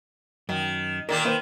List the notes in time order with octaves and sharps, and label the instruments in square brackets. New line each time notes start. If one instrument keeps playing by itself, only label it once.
[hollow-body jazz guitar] F#2 [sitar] D#3
[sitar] A#2 D#3 A#3 [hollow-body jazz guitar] A#4
[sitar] D#3 [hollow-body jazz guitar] A#3 B4 C5